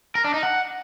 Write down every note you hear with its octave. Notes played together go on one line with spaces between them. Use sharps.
A#4
D4
D#4
F#5